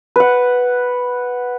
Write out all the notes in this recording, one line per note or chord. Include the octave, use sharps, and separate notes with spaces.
B4 F#5